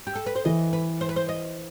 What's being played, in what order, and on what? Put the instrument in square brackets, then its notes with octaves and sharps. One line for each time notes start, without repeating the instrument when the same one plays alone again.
[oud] G4
A4
B4
C5
[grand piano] E3 [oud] D#5
[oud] B4
C5
B4
C5
D#5